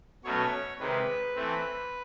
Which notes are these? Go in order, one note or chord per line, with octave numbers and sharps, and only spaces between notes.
B2 F#3 A3 C#4 C#5
C3 D#3 G#3 B4
E3 A3 C4